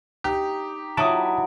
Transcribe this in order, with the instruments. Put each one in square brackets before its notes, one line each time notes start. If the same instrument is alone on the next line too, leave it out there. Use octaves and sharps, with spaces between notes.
[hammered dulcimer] D#4 [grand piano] G4
[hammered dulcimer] F#3 D#4 [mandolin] E4 F#4 D6 [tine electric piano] A5 D#6